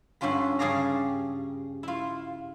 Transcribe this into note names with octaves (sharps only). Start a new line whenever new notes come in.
G2 D3 C#4 F4 B5
G2 C#3 G#4 D5 F5 A#5
E4 F4